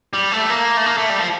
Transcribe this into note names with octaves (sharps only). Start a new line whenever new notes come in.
G3
A3
A#3
A3
A#3
A3
G3
F3